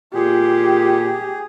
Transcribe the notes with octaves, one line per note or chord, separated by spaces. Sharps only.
A#2 G4 G#4